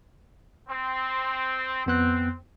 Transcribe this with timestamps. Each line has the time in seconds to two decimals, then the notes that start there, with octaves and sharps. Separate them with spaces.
0.68 C4
1.86 F2 B3 C4 F#6